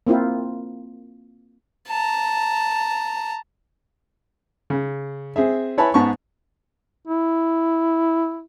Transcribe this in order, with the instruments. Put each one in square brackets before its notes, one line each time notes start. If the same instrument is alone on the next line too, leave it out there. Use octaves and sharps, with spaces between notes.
[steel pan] A#3 C4 E4 F4
[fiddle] A5 A#5
[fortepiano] C#3
C4 G#4 E5
E4 B4 C#5 G#5 A5 B5
G#2 B3 A5 C#6
[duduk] E4